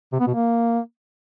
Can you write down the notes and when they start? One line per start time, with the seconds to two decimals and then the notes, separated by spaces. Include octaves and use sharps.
0.13 C3
0.20 B3
0.27 B2
0.34 A#3